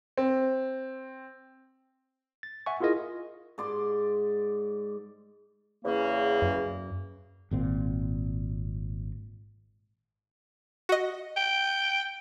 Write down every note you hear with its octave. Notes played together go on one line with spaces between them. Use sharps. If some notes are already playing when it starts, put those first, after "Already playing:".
C4
A6
E5 F#5 G#5 C#6
E4 F4 G#4 A#4 D#5
G#2 D5 C6
E2 C#3 A#3
F#2
G#1 A#2 C4
F#4 D#5
G5